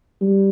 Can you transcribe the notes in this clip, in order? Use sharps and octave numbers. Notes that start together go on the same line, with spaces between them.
G3